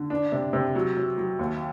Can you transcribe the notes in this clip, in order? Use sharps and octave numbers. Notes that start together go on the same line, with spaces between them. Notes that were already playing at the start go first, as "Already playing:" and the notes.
Already playing: D3
D4
C3
C3
F#3
F#3
F#3
D#2